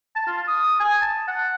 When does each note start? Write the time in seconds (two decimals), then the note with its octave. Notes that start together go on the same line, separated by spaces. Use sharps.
0.16 A5
0.27 F4
0.48 D#6
0.80 G#5
1.02 A5
1.28 F#5